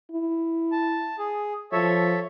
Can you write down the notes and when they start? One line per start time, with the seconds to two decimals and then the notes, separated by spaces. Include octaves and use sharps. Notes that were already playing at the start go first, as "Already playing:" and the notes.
0.11 E4
0.72 A5
1.19 G#4
1.72 F3 A4 C#5 E5